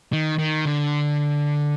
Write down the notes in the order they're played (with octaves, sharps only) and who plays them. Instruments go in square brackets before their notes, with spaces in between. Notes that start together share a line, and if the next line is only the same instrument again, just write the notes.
[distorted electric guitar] D#3
D#3
D3